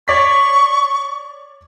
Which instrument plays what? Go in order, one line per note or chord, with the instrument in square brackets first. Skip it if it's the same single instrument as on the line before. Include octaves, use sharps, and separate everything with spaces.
[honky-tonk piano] C#5 D5 B6 [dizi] C#6